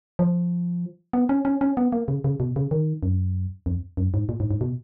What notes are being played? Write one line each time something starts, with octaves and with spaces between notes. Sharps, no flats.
F3
B3
C#4
C#4
C#4
B3
A#3
C#3
C#3
B2
C#3
D#3
F#2
F2
F#2
G#2
A#2
G#2
G#2
B2